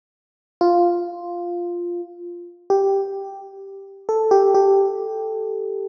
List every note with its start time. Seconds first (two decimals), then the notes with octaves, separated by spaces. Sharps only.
0.61 F4
2.70 G4
4.09 A4
4.31 G4
4.54 G4